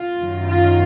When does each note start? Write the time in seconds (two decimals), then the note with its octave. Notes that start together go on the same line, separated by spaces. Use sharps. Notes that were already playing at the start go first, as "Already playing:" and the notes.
Already playing: F4
0.19 F#2 D#3 F#3
0.48 F4